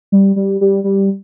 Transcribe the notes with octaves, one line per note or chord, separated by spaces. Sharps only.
G3
G3
G3
G3